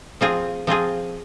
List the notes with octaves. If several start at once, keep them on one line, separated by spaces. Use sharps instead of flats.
F3 C4 F4 G#4
F3 C4 F4 G#4